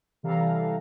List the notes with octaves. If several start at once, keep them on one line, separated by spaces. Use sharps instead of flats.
C3 E3 G3 A4 F5 A#5